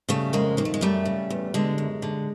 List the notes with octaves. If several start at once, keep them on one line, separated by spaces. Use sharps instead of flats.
C#3 G3 A3
F2 G#3 A#3
D#3 A#3
A3
G#3
F#2 G3 A3
C#3
E2
D3 G#3
F#2
D3